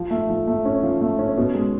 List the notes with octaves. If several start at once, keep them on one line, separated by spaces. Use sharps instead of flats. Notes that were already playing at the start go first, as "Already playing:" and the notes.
Already playing: F3
A3
F3
A3
C#4
F3
A3
C#4
B2
G#3